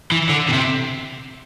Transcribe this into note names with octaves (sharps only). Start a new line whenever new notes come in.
E3
D3
B2
C3